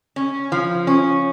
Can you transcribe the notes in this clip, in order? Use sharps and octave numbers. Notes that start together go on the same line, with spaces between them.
C#4
F3
C#4